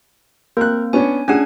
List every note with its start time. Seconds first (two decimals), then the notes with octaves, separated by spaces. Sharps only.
0.57 A#3 C4 A#4 F#6
0.93 B3 C#4 D4 G#5
1.28 C#4 D4 G#4 F#5 G#5